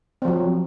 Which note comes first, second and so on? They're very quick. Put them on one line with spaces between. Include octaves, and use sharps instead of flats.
C4 F3 F#3